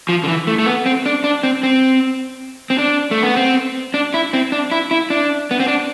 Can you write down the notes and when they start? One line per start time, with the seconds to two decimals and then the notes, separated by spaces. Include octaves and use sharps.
0.09 F3
0.24 D3
0.28 E3
0.47 A3
0.59 A3
0.66 B3
0.86 C4
1.06 D4
1.24 D4
1.44 C4
1.63 C4
2.70 C4
2.78 D4
3.11 A3
3.23 B3
3.37 C4
3.94 D4
4.14 E4
4.33 C4
4.52 D4
4.71 E4
4.91 E4
5.10 D4
5.51 B3
5.60 C4
5.68 D4